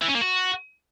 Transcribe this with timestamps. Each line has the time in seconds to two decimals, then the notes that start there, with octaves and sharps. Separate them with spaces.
0.02 E3
0.08 C#4
0.15 A#3
0.21 F#4